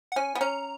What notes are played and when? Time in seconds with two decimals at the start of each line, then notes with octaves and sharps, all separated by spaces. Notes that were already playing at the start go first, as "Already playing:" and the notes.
0.12 F#5
0.16 C#4 G#5
0.35 B3
0.41 C#4 A#5